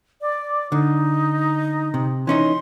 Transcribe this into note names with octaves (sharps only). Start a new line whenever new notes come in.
D5
D3 D#4
C3
E3 C#4 D#4 C6